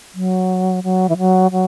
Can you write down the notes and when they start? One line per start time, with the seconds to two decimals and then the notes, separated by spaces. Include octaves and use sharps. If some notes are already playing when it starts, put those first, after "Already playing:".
0.14 F#3
0.84 F#3
1.09 E3
1.18 F#3
1.51 F#3